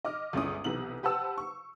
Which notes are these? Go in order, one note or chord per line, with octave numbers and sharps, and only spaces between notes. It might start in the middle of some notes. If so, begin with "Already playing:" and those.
D#5 D6 F6
G1 C#2 C#4 E4 D#6
B1 C3 E3 B3 F#7
G4 B4 C5 F#5 A5 E6
C#6